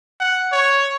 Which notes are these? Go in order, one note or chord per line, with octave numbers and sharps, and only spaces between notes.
F#5
C#5